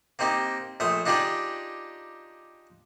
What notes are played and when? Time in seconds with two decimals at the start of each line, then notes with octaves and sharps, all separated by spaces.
0.19 A#3 C4 D#4 G4
0.80 A#1 A3 C5 D#6
1.06 D4 D#4 F4 G4 G#4 D5